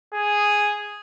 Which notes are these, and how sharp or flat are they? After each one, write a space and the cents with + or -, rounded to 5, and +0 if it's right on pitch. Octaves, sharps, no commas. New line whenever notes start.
G#4 -5